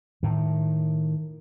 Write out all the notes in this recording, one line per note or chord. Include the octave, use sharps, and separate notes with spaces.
A2 D#3